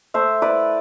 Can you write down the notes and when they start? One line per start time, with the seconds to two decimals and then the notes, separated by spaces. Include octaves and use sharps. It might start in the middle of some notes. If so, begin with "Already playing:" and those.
0.14 A3 C5 E5
0.42 E4 B4 D5